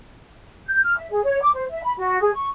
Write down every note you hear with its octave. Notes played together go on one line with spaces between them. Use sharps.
G6
F6
E5
G#4
C#5
D6
C5
E5
B5
F#4
G#4
C#6